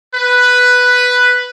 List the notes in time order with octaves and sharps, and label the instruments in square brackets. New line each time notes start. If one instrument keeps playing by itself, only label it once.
[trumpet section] B4